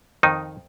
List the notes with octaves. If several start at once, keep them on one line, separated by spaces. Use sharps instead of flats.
F2 D#3 D#4